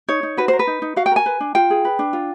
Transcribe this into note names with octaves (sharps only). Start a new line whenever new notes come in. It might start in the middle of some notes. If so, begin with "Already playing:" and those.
D#4 C#5
D#4
F#4 B4
A#4 C5
B4
D#4
D#4
F#4 F5
G5
A#4 G#5
B4
D4
F4 G5
G#4
B4
D4
F4